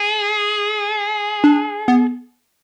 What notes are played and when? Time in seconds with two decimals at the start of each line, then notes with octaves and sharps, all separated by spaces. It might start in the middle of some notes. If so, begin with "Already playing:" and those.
Already playing: G#4
1.44 D4
1.88 B3